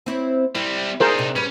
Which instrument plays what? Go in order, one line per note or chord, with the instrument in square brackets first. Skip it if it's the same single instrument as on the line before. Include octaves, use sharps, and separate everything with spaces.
[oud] C4 E4 C#5
[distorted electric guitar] G3 C4 [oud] E4
[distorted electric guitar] D4 D#4 [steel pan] G#4 A#4 C5
[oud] C3
[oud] G2 G3 B4 [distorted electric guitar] C#4